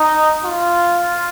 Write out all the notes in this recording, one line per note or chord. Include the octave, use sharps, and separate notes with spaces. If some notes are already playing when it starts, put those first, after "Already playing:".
Already playing: D#4
F4